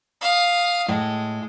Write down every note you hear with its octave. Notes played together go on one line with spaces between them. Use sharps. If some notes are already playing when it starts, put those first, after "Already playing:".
F5 D#6
A2 G#3